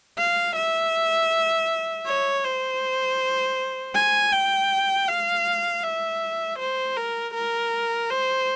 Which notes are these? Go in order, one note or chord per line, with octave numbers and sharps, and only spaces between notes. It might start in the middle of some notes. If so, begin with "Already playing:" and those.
F5
E5
C#5
C5
G#5
G5
F5
E5
C5
A#4
A#4
C5